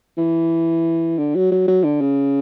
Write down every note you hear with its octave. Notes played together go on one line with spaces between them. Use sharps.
E3
D3
F#3
F#3
F#3
D3
C#3